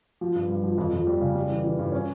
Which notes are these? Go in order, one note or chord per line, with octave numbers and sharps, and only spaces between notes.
F3
G2
G2
F3
F2
F2
G3
C#3
G3
E3
E3
G2
C#4